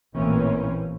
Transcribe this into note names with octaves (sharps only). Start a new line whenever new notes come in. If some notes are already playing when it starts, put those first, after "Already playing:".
A1 A#2 E3 A#3 C4 C#4